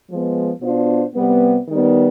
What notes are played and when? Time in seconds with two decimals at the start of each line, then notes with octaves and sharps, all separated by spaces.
0.09 F3 G#3 B3
0.61 B2 B3 D4 F4 C5
1.14 C3 G3 B3
1.67 D#3 G3 B3